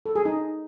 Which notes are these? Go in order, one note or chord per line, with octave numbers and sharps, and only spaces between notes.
A4
G#4
D#4